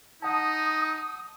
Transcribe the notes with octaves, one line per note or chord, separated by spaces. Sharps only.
D#4 F#5 A5 D#6